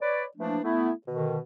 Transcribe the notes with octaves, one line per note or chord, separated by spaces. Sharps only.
B4 C#5 D5
E3 F3 A3 A#3 D4
A3 B3 E4
B2 D3 D#3